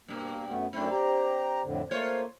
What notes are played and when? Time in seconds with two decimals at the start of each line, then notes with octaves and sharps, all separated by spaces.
0.08 G2 B2 A#3
0.49 F#2 A3 B3
0.73 F#2 A3 C4 D4 E4
0.91 G4 A#5
1.64 F2 A2 D3
1.91 A3 A#3 F4 C5 C#5